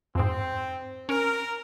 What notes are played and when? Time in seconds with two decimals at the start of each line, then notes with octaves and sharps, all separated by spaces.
0.15 F2 G#2 C4
1.09 C#4 A#4